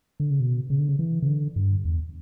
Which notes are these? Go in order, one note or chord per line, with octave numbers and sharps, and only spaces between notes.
D3
C#3
B2
C#3
D3
C#3
E3
C#3
D3
G2
E2